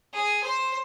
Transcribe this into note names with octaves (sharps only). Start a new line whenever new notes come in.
G#4
C5